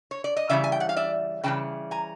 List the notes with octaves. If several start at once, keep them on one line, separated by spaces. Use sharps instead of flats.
C#5
D5
D#5
C#3 E3 G3 D5 E5
G#5
G5
F#5
F5
D5 E5
C#3 E3 G3 G5 A5
G#5 A#5